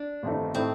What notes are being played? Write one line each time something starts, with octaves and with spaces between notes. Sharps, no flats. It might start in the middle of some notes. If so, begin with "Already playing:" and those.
Already playing: D4
G1 F2 D#3 A3 D#4
A2 A3 C4 D#4